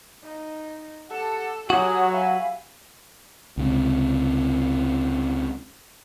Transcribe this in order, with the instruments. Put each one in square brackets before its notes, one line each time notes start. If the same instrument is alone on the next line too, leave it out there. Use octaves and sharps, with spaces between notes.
[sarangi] D#4
[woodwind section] G4 F#5 A5 [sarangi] A4
[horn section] F#3 [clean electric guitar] F#4 [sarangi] G4 [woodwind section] G#5 D#6
[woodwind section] E5 G#5 B5 [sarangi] F5
[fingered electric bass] C#2 C3